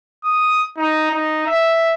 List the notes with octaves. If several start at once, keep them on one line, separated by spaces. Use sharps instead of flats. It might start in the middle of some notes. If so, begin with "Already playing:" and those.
D#6
D#4
D#4
E5